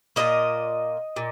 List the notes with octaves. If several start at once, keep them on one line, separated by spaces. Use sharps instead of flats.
A#2 F3 A#3 D#5
A#2